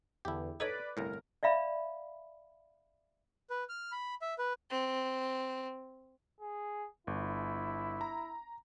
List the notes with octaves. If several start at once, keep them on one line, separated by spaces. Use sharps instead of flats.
E2 D3 E4 G4
D#4 A4 B4 C#5 D5
G1 C2 A2 A#4
D5 E5 F5 B5
B4
F6
B5
E5
B4
C4
G#4
G1 E4
A#5